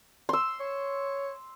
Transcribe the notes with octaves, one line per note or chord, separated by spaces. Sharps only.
C6 E6
C#5